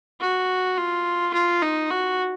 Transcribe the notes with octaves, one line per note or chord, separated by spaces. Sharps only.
F#4
F4
F4
D#4
F#4